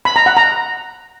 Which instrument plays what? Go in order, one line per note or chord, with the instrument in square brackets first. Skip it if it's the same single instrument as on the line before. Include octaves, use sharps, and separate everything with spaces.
[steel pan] B5
A#5
F#5
A#5